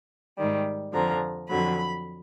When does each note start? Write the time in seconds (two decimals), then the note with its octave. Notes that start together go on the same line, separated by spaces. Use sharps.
0.38 G#2 D#3 G3
0.93 F2 D3 F3 A#5
1.49 F2 D3 F#3 B5